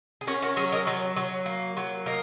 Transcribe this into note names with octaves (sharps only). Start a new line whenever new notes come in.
G#4
C#4 F#4 A#4
F#4 A#4
F#3 G#4 C#5
A#4 D#5
F#3
F#3
A#3
F#3
A#3 A#4 D#5